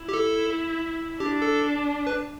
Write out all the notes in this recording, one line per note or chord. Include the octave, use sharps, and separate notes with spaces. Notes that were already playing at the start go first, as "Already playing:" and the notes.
Already playing: E4
G4
A4
D4 G4
A4
B4